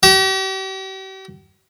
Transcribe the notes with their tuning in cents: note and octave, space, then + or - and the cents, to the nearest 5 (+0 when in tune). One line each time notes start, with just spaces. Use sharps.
G4 -40